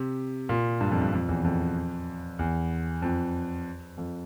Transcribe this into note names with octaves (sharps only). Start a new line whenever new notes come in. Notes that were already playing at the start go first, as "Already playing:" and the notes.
Already playing: C3
A#2
G2
F2
G2
F2
E2
F2
E2
F2
F2